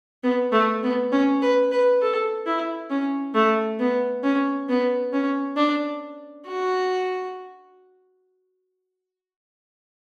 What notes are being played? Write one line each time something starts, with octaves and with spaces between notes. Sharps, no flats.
B3
A3
B3
C#4
B4
B4
A4
E4
C#4
A3
B3
C#4
B3
C#4
D4
F#4